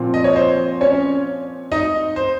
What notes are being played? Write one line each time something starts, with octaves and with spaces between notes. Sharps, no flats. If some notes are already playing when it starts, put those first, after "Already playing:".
Already playing: A#2 F3 C4
D#5
C#5
C5
C#4 C#5
D#4 D#5
C5